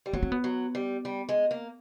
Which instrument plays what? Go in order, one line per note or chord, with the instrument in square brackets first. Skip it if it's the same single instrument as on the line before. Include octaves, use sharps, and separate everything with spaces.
[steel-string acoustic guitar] G3
[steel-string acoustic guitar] F#3 [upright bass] B3
[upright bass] C4
B3
[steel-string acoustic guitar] F#3
G3
G3
G#3
A#3